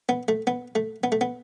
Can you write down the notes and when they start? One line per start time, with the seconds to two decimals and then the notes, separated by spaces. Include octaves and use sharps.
0.09 B3
0.28 A3
0.47 B3
0.75 A3
1.04 B3
1.12 A3
1.21 B3